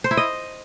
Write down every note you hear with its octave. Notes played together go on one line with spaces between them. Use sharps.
C5
E4
D#5